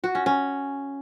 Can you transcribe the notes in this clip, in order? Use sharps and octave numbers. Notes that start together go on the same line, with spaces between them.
F#4
C#4
C#4